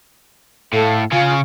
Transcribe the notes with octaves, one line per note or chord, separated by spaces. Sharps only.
A2 A4 F5
C#3 C#4 F4 G#5